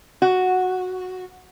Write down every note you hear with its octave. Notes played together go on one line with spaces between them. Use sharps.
F#4